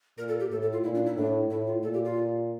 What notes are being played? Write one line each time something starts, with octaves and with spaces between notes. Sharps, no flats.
A#2 A#4
A4
G4
A2 A4
A4
F4
A#2 E4
D4
E4
A2 D4
A2 E4
F4
A#2 A4
G4
F4